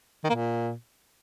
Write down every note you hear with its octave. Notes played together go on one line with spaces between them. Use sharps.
D#3
A#3
A#2